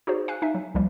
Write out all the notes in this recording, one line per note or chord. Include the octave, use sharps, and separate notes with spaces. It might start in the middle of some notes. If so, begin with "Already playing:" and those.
D#4 F#4 G#4 C5 D5
F5 G#5 F#6
D#4 E5 G#5
F#3
C#2 F3 G3 A#3